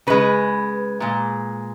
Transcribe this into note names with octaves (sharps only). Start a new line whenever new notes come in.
C#3 G#3 B4
A#2 G#3